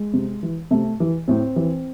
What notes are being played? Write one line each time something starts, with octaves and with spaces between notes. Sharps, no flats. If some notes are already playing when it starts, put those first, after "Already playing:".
Already playing: G#3
C3
E3
C3 A3
E3
A2 C4
E3